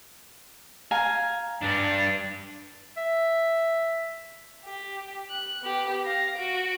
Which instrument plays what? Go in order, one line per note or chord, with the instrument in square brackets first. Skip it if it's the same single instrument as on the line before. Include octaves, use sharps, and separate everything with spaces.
[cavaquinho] F5 G#5 A#5
[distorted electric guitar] G2 D4
[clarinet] E5
[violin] G4
F#6
B3 G4
F5 A#6
F#4 D7